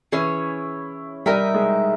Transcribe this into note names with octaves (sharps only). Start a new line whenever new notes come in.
E3 C#4 E4 G#4 C#5
G3 D#4 G4 A#4 E5
G#3 G#4